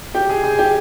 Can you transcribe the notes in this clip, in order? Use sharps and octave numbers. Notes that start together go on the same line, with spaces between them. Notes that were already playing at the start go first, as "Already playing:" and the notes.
G4
G#4
G#4
G4